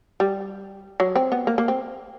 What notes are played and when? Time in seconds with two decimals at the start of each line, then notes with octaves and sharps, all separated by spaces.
0.20 G3
1.00 F#3
1.16 C4
1.32 B3
1.47 A#3
1.58 A#3
1.68 C4